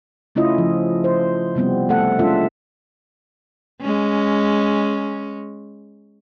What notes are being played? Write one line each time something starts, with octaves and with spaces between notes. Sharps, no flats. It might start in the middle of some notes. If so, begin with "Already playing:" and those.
C#3 A3 C#4 E4 F4 D#5
F3
C5
C3 G3 B3 C4
A3 B3 A4 F#5
G#3 C#4 D4 F4 A4 E5
G#3 C#4